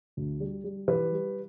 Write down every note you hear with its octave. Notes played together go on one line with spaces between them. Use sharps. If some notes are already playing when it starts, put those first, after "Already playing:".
D2
G3
G3
E3 G4 B4
G3